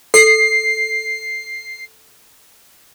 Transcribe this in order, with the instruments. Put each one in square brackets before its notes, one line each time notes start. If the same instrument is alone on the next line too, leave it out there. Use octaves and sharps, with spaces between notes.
[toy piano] A4 [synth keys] C7